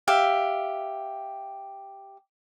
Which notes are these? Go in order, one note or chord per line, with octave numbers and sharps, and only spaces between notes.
G4 E5 F5